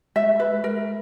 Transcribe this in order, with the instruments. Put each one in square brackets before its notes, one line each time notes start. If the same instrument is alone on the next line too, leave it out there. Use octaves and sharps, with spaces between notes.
[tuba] G#3 [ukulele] E5
[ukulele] B4
[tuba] G#3 [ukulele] A#4